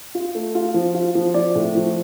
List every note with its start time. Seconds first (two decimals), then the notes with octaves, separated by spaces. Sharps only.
0.15 F4
0.35 A3
0.55 F4
0.74 F3
0.94 F4
1.15 F3
1.34 F3 D5
1.55 A2
1.75 F3